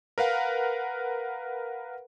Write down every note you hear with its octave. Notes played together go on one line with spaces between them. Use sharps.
A#4 B4 F5 F#5